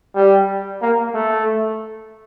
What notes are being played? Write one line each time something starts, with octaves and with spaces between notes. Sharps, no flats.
G3
A#3
A3